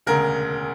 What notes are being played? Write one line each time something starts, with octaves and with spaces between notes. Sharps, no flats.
E1 D2 C#3 A#4